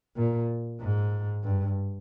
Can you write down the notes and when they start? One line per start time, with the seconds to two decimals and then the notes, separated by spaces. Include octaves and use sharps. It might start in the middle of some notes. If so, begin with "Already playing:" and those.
0.16 A#2
0.80 G#2
1.44 G2